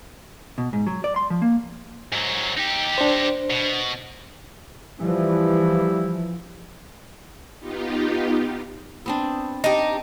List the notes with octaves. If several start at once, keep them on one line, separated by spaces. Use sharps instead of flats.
B2
G#2
F#3
D5
C6
F3
A#3
G#2 F#3
D#4 G4
D4 C5
B2
E3 F3 G3 E4
B3 D#4 F4 G4
B3 C4 D4
D4 D#4 G4